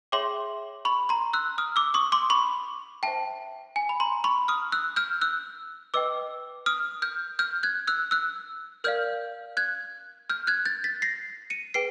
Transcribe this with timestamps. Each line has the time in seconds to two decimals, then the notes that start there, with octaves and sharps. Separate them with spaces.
0.12 G#4 C#5 E5 G5 C6 D6
0.85 B5 C#6
1.09 A#5 C6
1.33 E6 F#6
1.58 D#6 F6
1.76 D6 E6
1.94 C#6 D#6
2.12 C6 D6
2.30 B5 C#6
3.03 C5 E5 G5 A5
3.76 G#5
3.89 B5
4.00 A#5 C6
4.24 B5 C#6
4.48 D#6 F6
4.72 E6 F#6
4.96 F6 G6
5.21 E6 F#6
5.94 B4 D#5 G5 D6 E6
6.66 D#6 F6
7.02 F6 G6
7.39 F6 G6
7.63 F#6 G#6
7.87 E6 F#6
8.11 E6 F#6
8.84 A#4 D5 F5 F6 G6
9.57 F#6 G#6
10.30 F6 G6
10.47 F#6 G#6
10.66 G6 A6
10.84 A6 B6
11.02 A#6 C7
11.50 C#7 D#7
11.74 G#4 B4 G5 C7 D7